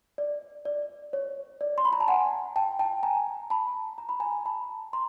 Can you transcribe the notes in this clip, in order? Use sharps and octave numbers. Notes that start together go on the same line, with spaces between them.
D5
D5
C#5
D5
C6
B5
A#5
A5
F#5 G#5
G5 A5
G5 A5
G#5 A#5
A5 B5
A#5
B5
G#5 A#5
A5 B5
A#5 C6